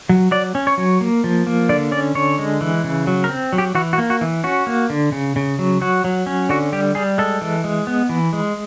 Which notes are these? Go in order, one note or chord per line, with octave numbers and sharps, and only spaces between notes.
F#3
F#3 D5
C#4
C#5
F#3
A#3
F3
A#3
D3 D5
C#4 D5
D3 C#5
G#3
E3
C#3
F#3
A#4
C4
F#3
G4
E3 F#4
F#4
A#3
F#4
E3
C#4 F#4
A#3
D3
C#3
C#3
F#3
F#3 F#4
F#3
C#4
D3 F#4
G3 G4
G3 G#4
G#3 A4
E3
G#3
B3
E3
G#3